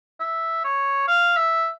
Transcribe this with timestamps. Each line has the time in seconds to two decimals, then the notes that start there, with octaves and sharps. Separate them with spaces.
0.20 E5
0.64 C#5
1.08 F5
1.37 E5